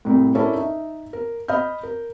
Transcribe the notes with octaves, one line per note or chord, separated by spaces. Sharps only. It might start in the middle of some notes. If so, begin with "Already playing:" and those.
C2 A2
C#4 E4 A4 A#4 D5
D#4 E5
A#4
D#5 B5 F6 G6
A#4